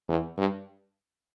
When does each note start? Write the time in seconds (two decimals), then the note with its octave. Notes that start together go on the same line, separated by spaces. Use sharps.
0.09 E2
0.38 G2